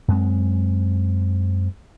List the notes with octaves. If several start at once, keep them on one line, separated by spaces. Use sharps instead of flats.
F#2 G#3 C4